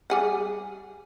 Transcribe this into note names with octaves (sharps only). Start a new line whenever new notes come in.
G3 G#4 F#5